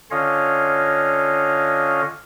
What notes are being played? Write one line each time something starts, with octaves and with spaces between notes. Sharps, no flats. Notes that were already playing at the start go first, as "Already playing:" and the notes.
D3 C#4 F4 C#5 D#5 F5